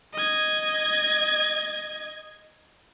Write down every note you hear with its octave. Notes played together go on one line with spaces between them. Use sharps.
D#5 G#6